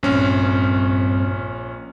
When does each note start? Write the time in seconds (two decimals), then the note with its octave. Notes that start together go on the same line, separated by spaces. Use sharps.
0.03 A#1 G2 C4 C#4